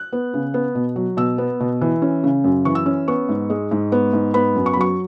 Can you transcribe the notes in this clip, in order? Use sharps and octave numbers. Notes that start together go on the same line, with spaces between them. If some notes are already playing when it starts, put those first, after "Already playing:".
Already playing: F#6
B3
C#3
B3
B2
F#3
B2 E6
B3
B2
E3
C#4
C#3
F#2
E3 C#6
E6
C#4
B3 C#6
G#2
G#3
G#2
B3
G#2
B3 B5
F#2
C#6
B5
F#3 C#6